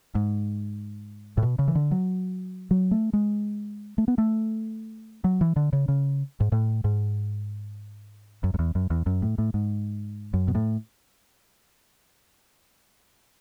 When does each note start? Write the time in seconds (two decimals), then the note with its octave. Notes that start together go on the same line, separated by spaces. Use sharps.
0.15 G#2
1.37 A2
1.42 B2
1.59 C#3
1.68 E3
1.75 D3
1.91 F#3
2.71 F#3
2.91 A3
3.13 G#3
3.98 A3
4.08 B3
4.18 A3
5.24 F#3
5.41 E3
5.56 D3
5.73 C#3
5.88 C#3
6.40 G#2
6.52 A2
6.84 G#2
8.44 F#2
8.54 F#2
8.59 E2
8.75 F#2
8.90 E2
9.06 F#2
9.22 A2
9.38 A2
9.54 G#2
10.34 F#2
10.48 B2
10.55 A2